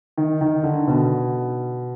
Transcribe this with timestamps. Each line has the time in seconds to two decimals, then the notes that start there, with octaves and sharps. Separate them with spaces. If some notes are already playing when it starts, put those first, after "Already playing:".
0.17 D#3
0.41 D#3
0.64 D3
0.87 B2